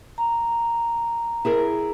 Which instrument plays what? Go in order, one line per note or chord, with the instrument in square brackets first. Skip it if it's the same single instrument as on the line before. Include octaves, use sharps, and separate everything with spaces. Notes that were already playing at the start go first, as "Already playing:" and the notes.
[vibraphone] A#5
[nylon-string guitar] E4 G#4 A#4